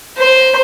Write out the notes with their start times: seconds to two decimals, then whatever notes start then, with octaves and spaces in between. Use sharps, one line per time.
0.17 C5